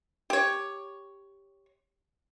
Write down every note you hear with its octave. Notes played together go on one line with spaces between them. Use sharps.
G4 C#5